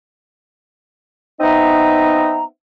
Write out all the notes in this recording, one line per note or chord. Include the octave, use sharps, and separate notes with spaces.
B3 C4 D#4 D#5 E5 A#5